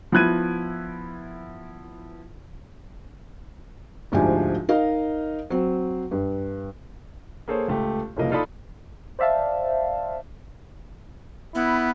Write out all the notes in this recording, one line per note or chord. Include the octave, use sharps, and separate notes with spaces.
F3 B3 E4 F#6 G#6 D#7
D2 G#2 F3 D4 G4 G#5
D#4 A#4 D#5 F5
F#3 C4
G2
A#3 G#4 A4 C5 C#5
C#2 A3 G4
F1 C2 C#3 F3 A#3 D#5
D#4 F4 A4 D5 B5 D#6
C5 D5 E5 F5 A5
B3 E4